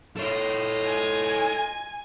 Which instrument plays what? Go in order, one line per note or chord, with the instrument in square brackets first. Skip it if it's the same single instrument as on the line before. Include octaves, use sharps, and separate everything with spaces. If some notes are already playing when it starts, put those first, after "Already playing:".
[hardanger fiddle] F4 D#5 [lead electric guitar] A4 C#5
[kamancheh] G#5